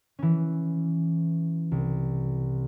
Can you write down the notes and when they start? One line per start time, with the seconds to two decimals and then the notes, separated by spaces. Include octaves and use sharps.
0.19 E3 C#4
1.71 C2